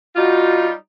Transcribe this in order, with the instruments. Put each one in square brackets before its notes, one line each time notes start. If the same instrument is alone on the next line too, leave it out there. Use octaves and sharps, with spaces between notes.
[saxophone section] G3 D#4 F4 [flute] F#4